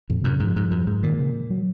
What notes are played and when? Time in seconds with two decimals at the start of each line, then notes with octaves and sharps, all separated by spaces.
0.10 F2 A#2
0.21 F#2 C3
0.32 C#3
0.40 G#2 F3
0.56 G#2
0.71 F#2
0.87 G#2
1.03 A#2 D#3
1.19 C#3
1.50 F#3